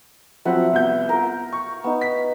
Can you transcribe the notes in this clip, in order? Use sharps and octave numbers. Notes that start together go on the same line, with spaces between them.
F3 F#3 C4 E5 F#5 B5
C2 B3 G6
F4 A#4
C#6
B3 D#4
B6